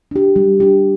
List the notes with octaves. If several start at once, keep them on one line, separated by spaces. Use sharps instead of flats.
D4 G4
G3
D4 G4